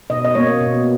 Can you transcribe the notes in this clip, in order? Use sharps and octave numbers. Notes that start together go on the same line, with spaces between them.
B2 D#5
D#5
A#3 C#5
B2